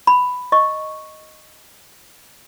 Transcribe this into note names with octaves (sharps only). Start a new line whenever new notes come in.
B5
D#5 C#6